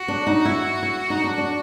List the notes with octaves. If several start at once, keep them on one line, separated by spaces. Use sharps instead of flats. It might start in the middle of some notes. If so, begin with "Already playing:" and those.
Already playing: F#4
D4
D#4
E4
E4
D#4
D4
D4